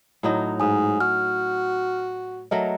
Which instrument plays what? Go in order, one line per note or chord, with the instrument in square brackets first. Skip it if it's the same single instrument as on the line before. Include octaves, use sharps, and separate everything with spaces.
[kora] A2 F#3 D#4
[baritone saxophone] G#2 [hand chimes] G#5 D#6
[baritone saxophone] F#4 [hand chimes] F6
[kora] F#3 A3 A#4 [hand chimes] D#5